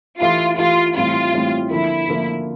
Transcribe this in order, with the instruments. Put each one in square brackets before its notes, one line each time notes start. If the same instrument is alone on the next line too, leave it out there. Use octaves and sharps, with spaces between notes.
[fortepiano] E3 A3 E4 G4 [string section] F4
[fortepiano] E3 A3 E4 G4 [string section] F4
[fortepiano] A2 E3 G3 C4 E4 [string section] F4
[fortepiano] A2 E3 G3 C4 E4
[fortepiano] D3 F3 A#3 [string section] E4
[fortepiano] D3 F3 A#3